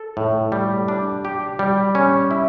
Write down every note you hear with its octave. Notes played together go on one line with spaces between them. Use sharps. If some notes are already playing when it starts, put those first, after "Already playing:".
Already playing: A4
A2
G3
D4
G4
G3
C#4
E4